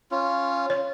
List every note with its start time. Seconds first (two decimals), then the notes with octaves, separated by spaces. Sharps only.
0.11 C#4 F4
0.70 C#5